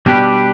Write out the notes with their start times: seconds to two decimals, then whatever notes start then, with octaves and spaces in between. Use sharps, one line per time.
0.06 B2 G3 D4 G4 B4